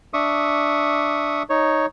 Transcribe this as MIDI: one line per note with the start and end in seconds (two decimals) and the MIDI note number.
0.14 1.43 62
0.14 1.43 76
0.14 1.43 85
0.14 1.43 87
1.49 1.86 63
1.49 1.86 73